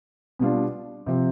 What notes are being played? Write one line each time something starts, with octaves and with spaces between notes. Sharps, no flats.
B2 G3 D4 F4
C3 F3 C4